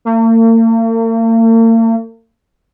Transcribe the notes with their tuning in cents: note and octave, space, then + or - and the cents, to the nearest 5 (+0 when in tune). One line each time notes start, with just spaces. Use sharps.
A#3 -45